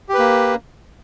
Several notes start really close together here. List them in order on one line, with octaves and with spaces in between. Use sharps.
G4 B4 A#3